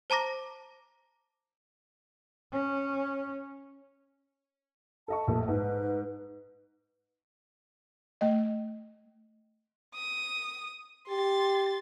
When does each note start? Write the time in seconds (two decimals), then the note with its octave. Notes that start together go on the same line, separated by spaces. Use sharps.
0.10 C5 A5 A#5 D6 A#6
2.53 C#4
5.08 A4 D#5 A5 C#6
5.27 A#1 A3
5.48 G#2 B4
8.21 A3 D#5
9.95 D#6
11.08 G4 C6 A6